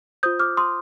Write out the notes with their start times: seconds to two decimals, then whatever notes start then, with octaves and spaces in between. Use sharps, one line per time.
0.23 F4 C5 D#6 G6
0.40 D6 F6
0.57 C6 D#6